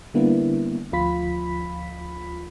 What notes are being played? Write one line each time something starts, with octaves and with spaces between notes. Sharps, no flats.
D3 G3 A#3 B3 D4 E4
D2 F3 F4 B5 B6